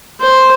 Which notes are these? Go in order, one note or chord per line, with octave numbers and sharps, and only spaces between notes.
C5